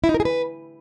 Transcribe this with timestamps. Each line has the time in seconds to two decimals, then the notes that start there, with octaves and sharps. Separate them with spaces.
0.04 E4
0.09 D#4
0.14 A#4
0.20 G#4
0.25 B4